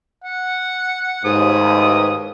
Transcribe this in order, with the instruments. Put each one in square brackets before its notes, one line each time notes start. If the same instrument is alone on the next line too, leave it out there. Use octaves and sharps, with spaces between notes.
[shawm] F#5
[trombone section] A1 D#2 [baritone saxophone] G#2 [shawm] D#6